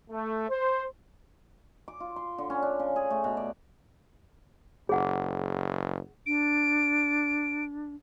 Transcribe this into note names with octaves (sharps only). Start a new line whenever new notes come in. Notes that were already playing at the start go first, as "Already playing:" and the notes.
A3
C5
D6
F4
C6
D3
C#4
D4
C#3
G#4
A3
B2
D5
F#1 G#4 F#5
D4 D7